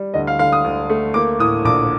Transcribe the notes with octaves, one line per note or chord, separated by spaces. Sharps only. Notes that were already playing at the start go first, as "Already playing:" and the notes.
Already playing: G3
D2 D#5
F5
D3 F5
D#6
D2
A3
A#3 D6
A2 D#6
A#1 D6